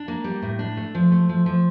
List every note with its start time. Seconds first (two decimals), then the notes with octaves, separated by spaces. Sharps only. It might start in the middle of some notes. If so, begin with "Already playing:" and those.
Already playing: D4
0.08 A#3
0.24 G3
0.42 A2
0.59 D4
0.77 A3
0.95 F3
1.12 A3
1.29 F3
1.46 F3